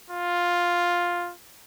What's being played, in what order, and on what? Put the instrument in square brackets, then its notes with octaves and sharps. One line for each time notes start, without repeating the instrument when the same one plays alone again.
[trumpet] F4